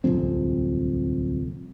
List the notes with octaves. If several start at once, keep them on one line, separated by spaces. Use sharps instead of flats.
D1 C2 F2 C4